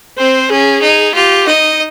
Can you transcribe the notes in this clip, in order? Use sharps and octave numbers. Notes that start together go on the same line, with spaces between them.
C4 C5
C#4 G#4
D#4
F4 G4
D#4 D#5